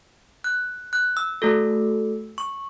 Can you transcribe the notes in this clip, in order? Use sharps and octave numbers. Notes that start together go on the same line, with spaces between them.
F#6
F#6
E6
A3 F#4 A4
C#6